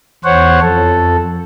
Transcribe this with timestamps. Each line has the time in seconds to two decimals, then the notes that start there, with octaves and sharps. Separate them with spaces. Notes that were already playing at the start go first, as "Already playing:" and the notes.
0.24 E2 C5 C#5 F#5
0.61 F2 A4